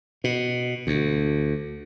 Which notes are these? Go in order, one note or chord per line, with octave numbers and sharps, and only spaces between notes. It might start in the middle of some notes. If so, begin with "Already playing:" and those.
B2
D2